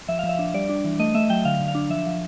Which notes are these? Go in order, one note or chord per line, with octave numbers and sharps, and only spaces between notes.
F3 E5
F3 F5
E5
D4
G3 D5
D4
E3
A3 D#5
A3 E5
F#3 G5
D3 F5
D3
F5
D4
F3 E5
F3